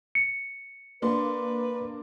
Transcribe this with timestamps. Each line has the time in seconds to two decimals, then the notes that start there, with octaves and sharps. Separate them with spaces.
0.15 C#7
1.02 A#3 D4 B4 C6